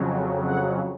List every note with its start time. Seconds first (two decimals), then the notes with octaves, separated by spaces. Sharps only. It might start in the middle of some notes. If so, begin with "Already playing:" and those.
Already playing: F2 C#3 F#3
0.46 F#5